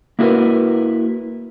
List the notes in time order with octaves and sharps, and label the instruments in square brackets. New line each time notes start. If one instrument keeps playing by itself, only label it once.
[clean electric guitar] A#3 E4 F#4 G#4 A#4 B4